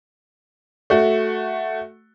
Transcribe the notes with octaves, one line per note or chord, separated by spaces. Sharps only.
A3 F#4